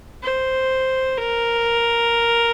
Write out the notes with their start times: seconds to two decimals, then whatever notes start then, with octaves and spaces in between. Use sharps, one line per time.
0.23 C5
1.17 A#4